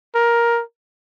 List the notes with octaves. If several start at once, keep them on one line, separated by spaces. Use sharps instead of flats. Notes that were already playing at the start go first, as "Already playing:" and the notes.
A#4